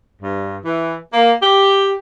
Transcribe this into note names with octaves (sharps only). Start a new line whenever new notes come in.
G2
E3
A#3
G4